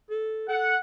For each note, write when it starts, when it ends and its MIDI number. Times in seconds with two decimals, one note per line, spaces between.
0.10 0.46 69
0.49 0.75 69
0.49 0.78 78